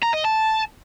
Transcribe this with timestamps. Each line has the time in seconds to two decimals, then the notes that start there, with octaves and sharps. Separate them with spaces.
0.03 A#5
0.14 D#5
0.25 A5